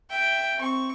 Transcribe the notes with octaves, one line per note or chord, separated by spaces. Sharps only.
E5 G5
C4 C#6